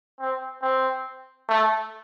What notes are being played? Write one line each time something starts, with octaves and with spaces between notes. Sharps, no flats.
C4
C4
A3